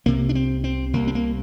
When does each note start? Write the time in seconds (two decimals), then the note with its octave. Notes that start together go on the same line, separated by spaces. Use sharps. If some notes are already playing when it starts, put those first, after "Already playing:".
0.06 C2 C3 A#3
0.29 D4
0.35 C4
0.64 C4
0.93 C2 C3 A#3
1.07 C4
1.15 A#3